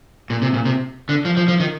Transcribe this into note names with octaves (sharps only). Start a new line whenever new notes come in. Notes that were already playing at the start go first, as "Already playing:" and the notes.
A#2
C3
A#2
C3
D3
F3
F3
F3
D#3